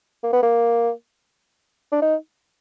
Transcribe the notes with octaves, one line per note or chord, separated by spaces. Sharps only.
A#3
B3
A#3
D4
D#4